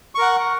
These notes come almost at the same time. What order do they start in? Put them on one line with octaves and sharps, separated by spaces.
C#6 A#4 F#5